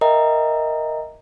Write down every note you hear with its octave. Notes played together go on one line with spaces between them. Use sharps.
A#4 D#5 E5 G5 A#5